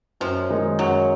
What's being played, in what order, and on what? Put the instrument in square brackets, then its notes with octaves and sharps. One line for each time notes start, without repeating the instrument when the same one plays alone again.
[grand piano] F#2 [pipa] F3
[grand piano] D#3 G#3 D#4
[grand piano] F#2 [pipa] F#3